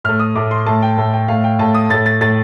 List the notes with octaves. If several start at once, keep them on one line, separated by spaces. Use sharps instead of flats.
A2 A3 F6
D#6
A2 A3 D6
C6
A2 A3 A5
G5
A2 A3
G5
A2 A3 F5
G5
A2 A3 A5
D#6
A2 A3 A6
A6
A2 A3 A6